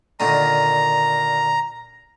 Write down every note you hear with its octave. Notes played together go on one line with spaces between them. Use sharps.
A#2 D3 D#3 A#5